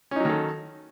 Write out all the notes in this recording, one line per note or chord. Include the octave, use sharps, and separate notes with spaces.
D#3 F#3 C#4 D#4 A4